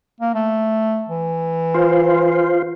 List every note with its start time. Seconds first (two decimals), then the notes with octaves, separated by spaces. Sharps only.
0.21 A#3
0.34 A3
1.09 E3
1.74 F4 C5